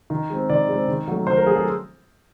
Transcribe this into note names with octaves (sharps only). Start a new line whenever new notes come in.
D#3
G#3 C4
D#3 D5
G#3 C4
D#3
F#3 A3
D#3 C5
A#4
F#3 A3 G#4
A4